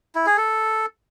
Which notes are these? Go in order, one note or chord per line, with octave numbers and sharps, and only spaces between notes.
E4
G#4
A4